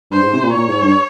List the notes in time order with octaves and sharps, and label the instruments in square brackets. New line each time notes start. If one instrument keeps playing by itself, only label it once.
[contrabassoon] G2 [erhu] C5
[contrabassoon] G#2
C3
A#2
[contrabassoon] A#2 [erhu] C#5
[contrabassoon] G#2
G2